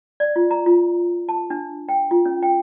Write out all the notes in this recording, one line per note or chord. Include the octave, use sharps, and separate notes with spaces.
D5
F4
A#5
F4
A5
D4
G5
F4
C#4
G5